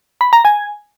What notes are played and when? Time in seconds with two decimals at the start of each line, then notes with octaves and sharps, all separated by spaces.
0.21 B5
0.33 A#5
0.45 G#5